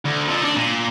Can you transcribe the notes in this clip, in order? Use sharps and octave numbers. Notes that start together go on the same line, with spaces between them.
D2
F3 A4
D4 D#4
A#2